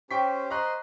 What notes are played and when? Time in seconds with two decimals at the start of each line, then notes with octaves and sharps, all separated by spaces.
0.11 C#4 G4 C5 G5 C#6 B6
0.50 C5 D#5 A#5 C6 C#6 F#6